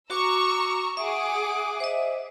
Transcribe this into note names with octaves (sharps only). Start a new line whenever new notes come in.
F#4 A#5 C#6 D6 E6
G#4 E5 F#5 D6 D#6
C5 D#5 E5